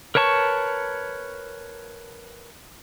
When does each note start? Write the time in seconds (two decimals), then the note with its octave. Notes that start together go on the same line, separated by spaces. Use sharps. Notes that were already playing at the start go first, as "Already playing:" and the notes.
0.15 A#4 B4 C#5 A5 C#6